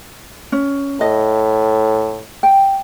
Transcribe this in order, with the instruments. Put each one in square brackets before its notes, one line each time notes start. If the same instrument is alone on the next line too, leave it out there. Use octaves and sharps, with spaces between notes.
[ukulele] C#4
[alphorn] A2 [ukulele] D#5
[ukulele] G5